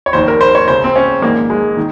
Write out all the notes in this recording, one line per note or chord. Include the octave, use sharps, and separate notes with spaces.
C#5
F1 D#2 D#3 C5
A#4
C5
C#5
C#2 C#3 C5
C4
C#4
A#1 G#2 D#3 A#3
G#3
D#3